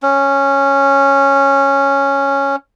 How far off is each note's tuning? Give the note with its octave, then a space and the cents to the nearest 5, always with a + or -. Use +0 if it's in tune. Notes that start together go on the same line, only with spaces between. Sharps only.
C#4 -5